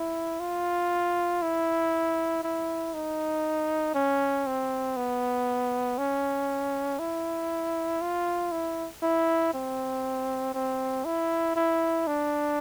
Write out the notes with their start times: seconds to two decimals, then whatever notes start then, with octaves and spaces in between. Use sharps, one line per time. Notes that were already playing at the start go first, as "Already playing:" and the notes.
Already playing: E4
0.40 F4
1.42 E4
2.43 E4
2.94 D#4
3.95 C#4
4.46 C4
4.96 B3
5.98 C#4
6.99 E4
8.01 F4
8.52 E4
9.03 E4
9.54 C4
10.54 C4
11.05 E4
11.56 E4
12.07 D4